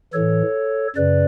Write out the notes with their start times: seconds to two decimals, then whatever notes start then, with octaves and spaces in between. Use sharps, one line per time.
0.14 A2 E3 A4 C#5
0.96 F#2 C#3 B4 D5